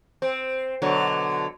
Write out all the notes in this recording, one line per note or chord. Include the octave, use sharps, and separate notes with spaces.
C4
B2 D3 F#3